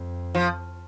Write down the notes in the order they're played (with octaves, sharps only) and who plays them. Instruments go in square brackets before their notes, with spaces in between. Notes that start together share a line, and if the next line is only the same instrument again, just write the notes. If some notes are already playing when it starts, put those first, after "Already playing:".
Already playing: [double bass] F2
[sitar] F3